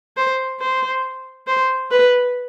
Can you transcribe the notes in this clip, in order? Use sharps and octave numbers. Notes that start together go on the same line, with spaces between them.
C5
C5
C5
B4